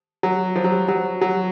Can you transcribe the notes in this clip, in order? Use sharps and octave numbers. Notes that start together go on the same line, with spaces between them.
F#3
F3
F#3
G3
F#3
F#3